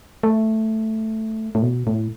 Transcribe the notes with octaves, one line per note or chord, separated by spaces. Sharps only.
A3
A2
B2
A2